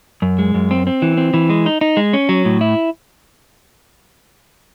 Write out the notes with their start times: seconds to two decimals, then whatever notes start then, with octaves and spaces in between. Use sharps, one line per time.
0.22 F#2
0.39 G#3
0.54 F#2
0.71 C4
0.87 C4
1.02 E3
1.17 C4
1.34 E3
1.50 G#3
1.66 D#4
1.81 D#4
1.97 G#3
2.13 C#4
2.29 F#3
2.45 A2
2.61 E4